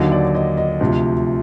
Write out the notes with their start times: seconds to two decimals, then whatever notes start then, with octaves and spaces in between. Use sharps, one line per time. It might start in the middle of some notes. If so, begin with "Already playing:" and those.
Already playing: D#2 D3 F#3 D#5
0.12 D5
0.35 D#5
0.57 D#5
0.80 D2 C3 F3